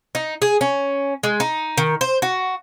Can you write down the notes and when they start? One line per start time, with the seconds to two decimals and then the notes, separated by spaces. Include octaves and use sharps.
0.15 D#4
0.42 G#4
0.61 C#4
1.23 G#3
1.40 D#4
1.77 D#3
2.01 C5
2.22 F#4